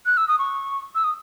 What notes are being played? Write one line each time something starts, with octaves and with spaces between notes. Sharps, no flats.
F#6
E6
D#6
C#6
E6
D#6